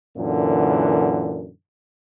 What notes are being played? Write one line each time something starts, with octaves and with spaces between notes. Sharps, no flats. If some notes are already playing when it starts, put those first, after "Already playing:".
F#2 A#2 D3 E3